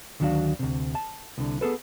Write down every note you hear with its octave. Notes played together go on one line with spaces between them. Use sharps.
D2 D#3 F#3 D4 F#4 F5
D2 C3
A5
C2 D3
B3 G#4 A4 B4